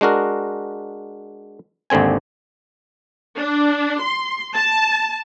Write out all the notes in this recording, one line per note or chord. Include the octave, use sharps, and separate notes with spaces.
G#3 D4 F#4 A#4
G#1 D#2 D3 C4 G#5
D4
C6
A5